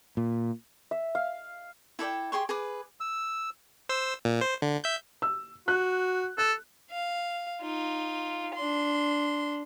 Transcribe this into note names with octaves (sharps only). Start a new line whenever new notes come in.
A#2
E5
F5
E4 A4 D5 G5
G4 G#4 C6 C#6
G#4 B4 D6
E6
C5 E6
A#2
C5
D3
E5 G6
E6
F#4 F#6
A4 F#6
F5
D#4 F4
D4 C6